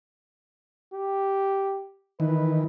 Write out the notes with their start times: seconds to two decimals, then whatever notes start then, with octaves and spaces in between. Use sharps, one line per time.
0.93 G4
2.20 D#3 E3 B4